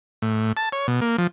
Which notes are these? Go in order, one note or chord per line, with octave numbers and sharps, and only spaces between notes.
A2
A5
C#5
B2
A#3
F3